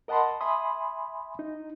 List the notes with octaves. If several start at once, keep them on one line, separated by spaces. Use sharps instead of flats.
A#4 D#5 F#5 A5 B5 C6
E5 G#5 B5 C6 D#6
D#4